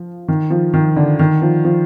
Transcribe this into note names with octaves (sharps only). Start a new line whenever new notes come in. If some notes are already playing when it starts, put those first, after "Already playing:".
Already playing: F3
D#3
F3
D#3
D3
D#3
F3
F3